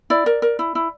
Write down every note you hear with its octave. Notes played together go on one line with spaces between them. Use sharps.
E4 D5
A#4
A#4
E4
E4